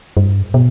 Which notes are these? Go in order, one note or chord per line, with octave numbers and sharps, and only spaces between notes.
G2
B2